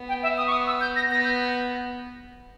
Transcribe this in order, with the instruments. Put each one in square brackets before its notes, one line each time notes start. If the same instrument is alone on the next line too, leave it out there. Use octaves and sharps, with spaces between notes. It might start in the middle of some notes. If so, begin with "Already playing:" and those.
Already playing: [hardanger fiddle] B3
[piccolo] G5
E5
D#6
C#6
D#6
E6
G6
A#6
[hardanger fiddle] B3 [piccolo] A#6
[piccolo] G6